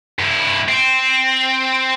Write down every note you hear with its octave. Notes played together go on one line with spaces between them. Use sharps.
G2 E4
C4